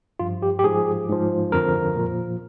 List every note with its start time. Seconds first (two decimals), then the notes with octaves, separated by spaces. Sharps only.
0.19 G2 F3 F4
0.42 G4
0.59 G4
0.64 G#2 F3 G#4
1.09 G#2 F3
1.52 F2 D3 F3 A#4
1.96 A#2 F3